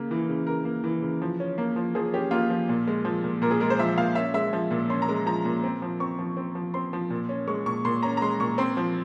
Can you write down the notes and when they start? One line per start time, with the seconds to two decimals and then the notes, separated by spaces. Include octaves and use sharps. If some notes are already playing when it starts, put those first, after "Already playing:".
Already playing: C#3 A#3
0.11 E3
0.29 C#3
0.47 C#3 A#4
0.65 A#3
0.84 E3
1.02 C#3
1.22 F3
1.40 C#4
1.58 A#3
1.76 F3
1.95 F3 G#4
2.14 C#4 G4
2.31 A#3 F4
2.50 F3
2.69 A#2
2.87 G#3
3.05 F3
3.24 A#2
3.42 A#2 A#4
3.51 G#4
3.61 G#3 A#4
3.70 C5
3.79 F3 E5
3.98 A#2 F5
4.15 C#4 E5
4.34 G#3 E5
4.53 F3
4.71 A#2
4.90 C#4 C6
5.02 A#5
5.09 G#3
5.26 F3 A#5
5.45 A#2
5.64 C4
5.82 F3
6.00 C4 C#6
6.19 F3
6.37 C4
6.55 F3
6.74 C4 C6
6.93 F3
7.10 A#2
7.29 C#4
7.47 G#3 C#6
7.66 A#2 C#6
7.85 A#2 C6
8.03 C#4 A#5
8.17 A#5
8.22 G#3 C6
8.40 A#2 C#6
8.58 C4 C6
8.77 F3